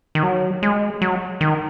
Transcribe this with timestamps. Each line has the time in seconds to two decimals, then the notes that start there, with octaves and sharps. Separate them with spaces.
0.15 D#3
0.23 F#3
0.63 G#3
1.02 F#3
1.41 D#3